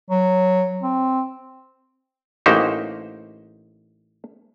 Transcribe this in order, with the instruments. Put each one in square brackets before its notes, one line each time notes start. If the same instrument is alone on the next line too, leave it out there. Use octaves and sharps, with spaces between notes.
[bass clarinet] F#3
C4
[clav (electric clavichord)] A1 A#3 D#4 F#4 G4 C5